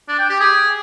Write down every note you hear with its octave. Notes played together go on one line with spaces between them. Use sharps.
D4
G5
G4
G#4